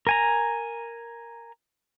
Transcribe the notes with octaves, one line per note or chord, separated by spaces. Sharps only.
A#4 G#5 A#5